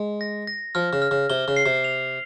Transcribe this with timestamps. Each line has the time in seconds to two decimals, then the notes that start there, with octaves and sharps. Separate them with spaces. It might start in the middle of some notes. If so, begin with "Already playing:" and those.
Already playing: G#3
0.21 A#6
0.47 A#6
0.75 F3 F6
0.93 C#3
1.02 F6
1.11 C#3
1.30 C3 G7
1.48 C#3
1.56 C7
1.66 C3
1.84 F7